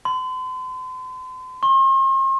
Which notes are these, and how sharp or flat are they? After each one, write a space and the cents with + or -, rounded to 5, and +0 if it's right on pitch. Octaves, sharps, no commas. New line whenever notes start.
C6 -40
C6 +45